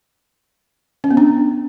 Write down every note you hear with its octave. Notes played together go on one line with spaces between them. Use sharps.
C#4
B3
D4